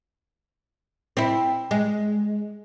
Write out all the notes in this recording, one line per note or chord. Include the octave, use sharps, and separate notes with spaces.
C4 E4
G#3